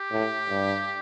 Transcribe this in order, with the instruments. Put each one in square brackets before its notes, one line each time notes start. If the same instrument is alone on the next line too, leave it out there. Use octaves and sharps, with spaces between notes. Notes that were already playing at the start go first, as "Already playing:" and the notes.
Already playing: [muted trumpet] G4
[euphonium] A2
G2